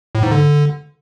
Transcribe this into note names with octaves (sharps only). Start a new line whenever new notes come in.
A2
G#2
D3